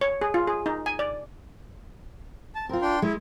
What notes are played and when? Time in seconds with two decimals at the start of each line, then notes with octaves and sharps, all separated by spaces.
0.01 C#5
0.21 G#4
0.34 F4
0.47 G#4
0.66 D#4
0.86 G#5
0.99 D5
2.55 A5
2.69 C4 F4 A#4
2.82 D4 G5 C6
3.02 G#3 E4